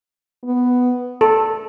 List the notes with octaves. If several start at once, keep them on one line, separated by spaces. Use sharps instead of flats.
B3
A4